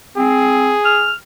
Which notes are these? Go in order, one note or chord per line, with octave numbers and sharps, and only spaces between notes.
C4 G#4
F6